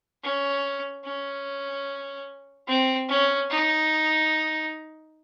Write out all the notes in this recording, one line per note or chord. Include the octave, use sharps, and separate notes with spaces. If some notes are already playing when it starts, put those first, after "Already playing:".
C#4
C#4
C4
C#4
D#4